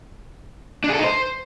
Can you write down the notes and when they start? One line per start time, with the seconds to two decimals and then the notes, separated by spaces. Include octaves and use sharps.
0.84 D4
0.89 G#4
0.94 A4
0.99 D#4
1.04 C5